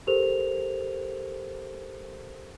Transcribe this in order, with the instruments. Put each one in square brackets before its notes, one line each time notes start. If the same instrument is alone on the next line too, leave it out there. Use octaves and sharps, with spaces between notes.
[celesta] G4 A4 A#4 C5 F7